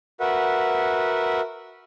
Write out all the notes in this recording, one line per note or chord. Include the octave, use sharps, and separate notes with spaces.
F#4 A#4 B4 E5 F#5